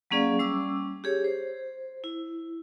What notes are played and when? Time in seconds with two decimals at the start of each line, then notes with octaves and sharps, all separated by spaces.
0.11 F#3 A#3 C#4 G#4 D5 F5
0.39 G3 C#4 D6 E6
1.04 G4 G#4 C#5
1.24 C5
2.04 E4